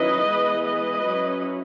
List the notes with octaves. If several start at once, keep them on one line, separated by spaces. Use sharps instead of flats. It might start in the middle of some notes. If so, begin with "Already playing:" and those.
Already playing: D#3 F#3 C#4 E4 B4 D#5
E3 G#3 B3
B4 D#5
F#3 C#4 E4